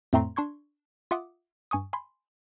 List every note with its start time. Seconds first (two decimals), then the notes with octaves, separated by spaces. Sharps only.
0.13 F2 A2 A3 C4 A#5 C6
0.36 D4 C6 C#6 G#6
1.11 F4 E5 F#5 D6 D#6
1.71 G2 G#5 C#6 D#6
1.93 G#5 B5 C6